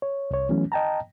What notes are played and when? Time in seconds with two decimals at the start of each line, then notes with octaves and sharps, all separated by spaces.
0.02 C#5
0.31 C2 C#5
0.49 E3 F#3 A3 B3 C#4
0.72 D#5 G5 A5 A#5